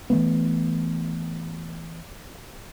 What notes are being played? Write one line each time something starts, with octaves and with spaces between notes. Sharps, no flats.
E3 F#3 A3 B3